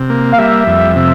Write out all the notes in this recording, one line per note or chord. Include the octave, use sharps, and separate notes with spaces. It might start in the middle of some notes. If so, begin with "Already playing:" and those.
Already playing: C3
A#3
F5
G3 E5
F2
C3